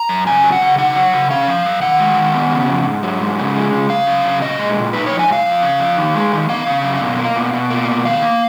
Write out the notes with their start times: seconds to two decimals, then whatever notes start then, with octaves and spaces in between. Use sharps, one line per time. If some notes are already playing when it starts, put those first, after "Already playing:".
Already playing: A#5
0.09 F#2
0.26 C#3 G#5
0.44 F#3
0.52 F#5
0.62 C#3
0.78 D#4 F#5
0.96 F#3
1.13 C#3
1.30 C#4 F5
1.48 F3
1.65 F#2
1.82 D#3 F#5
2.00 G#3
2.17 D#3
2.34 B3
2.52 C#3
2.69 F2
2.86 G#2
3.03 F#3
3.21 G#2
3.38 C#3
3.55 G#3
3.72 C#3
3.89 C#3 F5
4.07 F#3
4.24 C#3
4.42 A#2 D#5
4.59 G#3
4.77 A#2
4.93 D#4 B4
5.06 F3 C#5
5.19 G#5
5.28 G#2 F5
5.45 F2
5.63 C#3
5.80 F2
5.97 D#3
6.15 G#3
6.32 D#3
6.49 B3 F5
6.67 C#3
6.84 F#2
7.01 B2
7.18 A#3
7.36 B2
7.53 B2
7.70 A#3
7.87 B2
8.05 D#3 F5
8.22 A#3